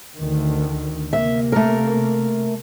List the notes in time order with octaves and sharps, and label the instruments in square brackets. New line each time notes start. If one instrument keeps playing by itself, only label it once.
[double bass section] D2 D3 D#3
[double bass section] C3 A#3 [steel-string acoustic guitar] E5
[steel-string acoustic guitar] A3 A#4